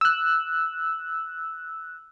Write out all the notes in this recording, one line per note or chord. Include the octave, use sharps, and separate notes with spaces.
E6 F#6